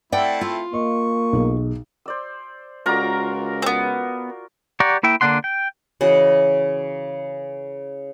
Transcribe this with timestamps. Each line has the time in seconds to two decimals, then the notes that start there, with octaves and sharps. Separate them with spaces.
0.12 A3 C4 E4 D5 F#5 G5
0.41 F4
0.73 A#3 D#5 C#6
1.33 B1 G#4 D#5
2.06 C5 D5 E6
2.86 C#2 F4 F#4 A#4 D5 A#5
3.62 B3 C4
4.80 G4 D5 F#5 A#5 C#6
5.03 A#3 E4 E5 G5
5.21 D3 A#3 D4 F#5 C6
5.44 G5
6.01 C#3 E3 F#4 D#5